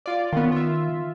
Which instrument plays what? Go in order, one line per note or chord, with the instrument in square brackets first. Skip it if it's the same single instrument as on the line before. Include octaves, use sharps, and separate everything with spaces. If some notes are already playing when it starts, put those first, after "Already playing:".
[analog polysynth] F4 D5
[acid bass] D#3 [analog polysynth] B3 C#4 F4
[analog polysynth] F4 E5